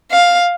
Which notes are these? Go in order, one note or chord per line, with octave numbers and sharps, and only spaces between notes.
F5